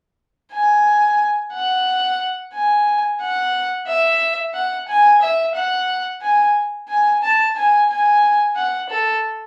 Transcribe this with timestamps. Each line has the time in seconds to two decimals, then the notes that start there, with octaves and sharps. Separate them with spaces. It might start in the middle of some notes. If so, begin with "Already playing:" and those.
0.53 G#5
1.53 F#5
2.54 G#5
3.21 F#5
3.88 E5
4.54 F#5
4.88 G#5
5.21 E5
5.55 F#5
6.22 G#5
6.89 G#5
7.23 A5
7.56 G#5
7.89 G#5
8.56 F#5
8.90 A4